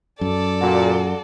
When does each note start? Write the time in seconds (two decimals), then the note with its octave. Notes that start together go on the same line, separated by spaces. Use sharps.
0.21 F#2 A4 D5
0.61 A#2 F#4